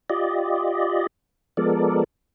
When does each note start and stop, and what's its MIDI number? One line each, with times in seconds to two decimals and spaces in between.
0.10 1.07 65
0.10 1.07 67
0.10 1.07 74
0.10 1.07 75
1.57 2.04 53
1.57 2.04 56
1.57 2.04 59
1.57 2.04 69
1.57 2.04 70
1.57 2.04 74